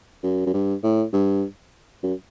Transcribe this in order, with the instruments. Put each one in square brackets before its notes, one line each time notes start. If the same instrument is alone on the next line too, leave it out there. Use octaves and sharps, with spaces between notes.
[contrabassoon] F#2
F#2
G2
A2
G2
F#2